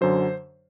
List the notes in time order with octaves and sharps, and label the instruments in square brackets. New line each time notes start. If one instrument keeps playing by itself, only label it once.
[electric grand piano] F#2 D3 F#3 C5